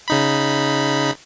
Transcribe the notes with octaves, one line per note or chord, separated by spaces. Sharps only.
C#3 D#4 B5